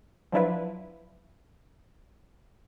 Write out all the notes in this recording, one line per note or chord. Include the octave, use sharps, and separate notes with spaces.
F3 F#3 D4 E4 F4 B4